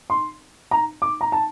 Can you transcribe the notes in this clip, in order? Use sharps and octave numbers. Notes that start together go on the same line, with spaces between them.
C6
A#5
D6
A#5
A5